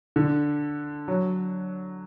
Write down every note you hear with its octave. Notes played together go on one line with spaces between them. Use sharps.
D3
F#3